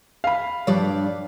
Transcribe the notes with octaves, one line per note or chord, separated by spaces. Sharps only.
F5 B5
G2 F3 G3 C#5 D5